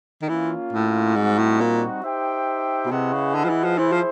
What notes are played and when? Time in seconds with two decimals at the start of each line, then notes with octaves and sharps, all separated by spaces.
0.22 D#3
0.29 E3 A#3 C#4 F4
0.73 A2
1.16 G#2 G3 C4 D#4 F#4
1.38 A2
1.60 A#2
2.03 D#4 G4 C5 E5 G5
2.86 B2
2.91 C3 E4 G#4 B4 D#5 F#5
3.13 C#3
3.35 D3
3.44 F3
3.50 E3
3.64 F3
3.78 E3 E4 G#4 C5
3.92 F3